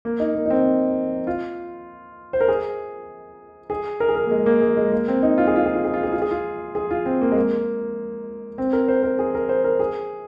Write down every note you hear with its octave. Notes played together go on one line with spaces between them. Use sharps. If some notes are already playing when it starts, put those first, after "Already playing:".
A#3
D#4
A#3
D#4
C4
F4
C5
A#4
G#4
G#4
A#4
G#4
A#4
A#3
G#3
A#3
G#3
G#3
A#3
C4
D#4
F4
G#4
F4
G#4
F4
G#4
F4
G#4
F4
G#4
F4
G#4
F4
C4
A#3
G#3
A#3
C4
A#4
C5
A#4
G#4
A#4
C5
A#4
G#4